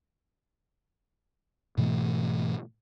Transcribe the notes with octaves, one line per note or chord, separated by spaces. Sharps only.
G#2 B2 E3 A3